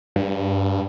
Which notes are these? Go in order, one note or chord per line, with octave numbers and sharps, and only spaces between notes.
G2